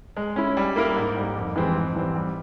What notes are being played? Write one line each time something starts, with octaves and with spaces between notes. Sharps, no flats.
G#3
C#4 E4
G3
A#3 E4 A#4
G#2
G3 A#3
F2
E3 G#3 C4 G4
G#2
E3 G3 C4
G3